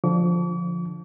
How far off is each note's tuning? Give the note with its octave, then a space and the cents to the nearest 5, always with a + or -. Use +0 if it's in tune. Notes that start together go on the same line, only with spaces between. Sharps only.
D3 +0 F3 +0 D6 -45